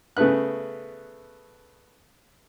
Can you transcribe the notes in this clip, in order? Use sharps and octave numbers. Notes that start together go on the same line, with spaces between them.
C#3 A3 B3 B4 F#6